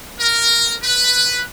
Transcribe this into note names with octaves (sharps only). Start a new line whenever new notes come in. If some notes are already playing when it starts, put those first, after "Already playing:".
A#4
B4